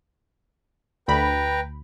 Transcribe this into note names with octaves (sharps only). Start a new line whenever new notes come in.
D2 B4 G5 A#5 B5